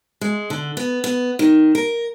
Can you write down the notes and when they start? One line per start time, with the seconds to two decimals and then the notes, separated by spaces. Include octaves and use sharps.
0.21 G#3
0.50 D3
0.77 B3
1.04 B3
1.39 D#3
1.75 A#4